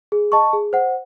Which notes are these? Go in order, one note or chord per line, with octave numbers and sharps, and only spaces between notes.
G#4
D#5 A5 C#6
G#4
C5 F#5